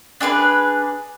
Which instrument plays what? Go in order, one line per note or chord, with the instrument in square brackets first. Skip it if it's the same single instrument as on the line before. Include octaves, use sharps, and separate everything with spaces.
[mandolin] D4 G#4 A#4 B4